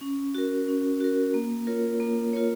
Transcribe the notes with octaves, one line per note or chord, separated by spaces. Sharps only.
C#4
F#4 A#4
C#4
F#4 A#4
A#3
F4 A#4 C#5
A#3
F4 A#4 C#5